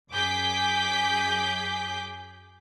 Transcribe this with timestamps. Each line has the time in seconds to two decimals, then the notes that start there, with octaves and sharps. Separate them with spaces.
0.12 F#2 G#4 D6 G6 B6